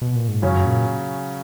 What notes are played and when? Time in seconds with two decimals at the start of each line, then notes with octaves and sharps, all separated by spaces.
0.02 B2
0.16 A#2
0.28 G#2
0.42 F#2 C#3 F#3 C#4
0.65 A#2